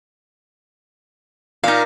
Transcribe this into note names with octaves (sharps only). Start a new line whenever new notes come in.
A#2 D#4 F5